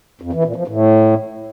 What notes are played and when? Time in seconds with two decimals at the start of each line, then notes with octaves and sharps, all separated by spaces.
0.21 F2
0.33 E3
0.44 A#2
0.56 F3
0.68 A2